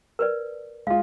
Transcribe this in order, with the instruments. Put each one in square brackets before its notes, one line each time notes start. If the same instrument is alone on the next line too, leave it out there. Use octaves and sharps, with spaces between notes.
[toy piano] A#4 B4 D5
[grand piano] G#3 F4 [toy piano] F5